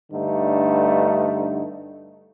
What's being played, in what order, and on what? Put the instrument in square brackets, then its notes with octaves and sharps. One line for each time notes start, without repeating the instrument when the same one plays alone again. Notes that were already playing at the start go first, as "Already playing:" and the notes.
[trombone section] G2 D3 A3 D#4